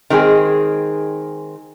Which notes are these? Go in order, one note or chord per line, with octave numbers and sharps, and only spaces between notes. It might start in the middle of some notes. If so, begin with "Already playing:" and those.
D#3 G#3 C4 G#4